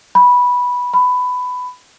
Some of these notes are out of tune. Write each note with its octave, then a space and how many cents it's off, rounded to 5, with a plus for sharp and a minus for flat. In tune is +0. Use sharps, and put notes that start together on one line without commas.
B5 -10
B5 +15